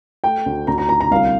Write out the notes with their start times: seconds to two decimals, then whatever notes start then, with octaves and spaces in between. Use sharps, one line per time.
0.24 A3 G5
0.46 D2
0.67 D2 A#5
0.78 A#5
0.89 D2 A#5
1.01 A#5
1.11 C2 F5